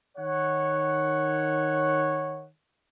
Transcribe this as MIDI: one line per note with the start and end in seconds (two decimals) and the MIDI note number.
0.18 2.47 51
0.18 2.47 73
0.18 2.47 78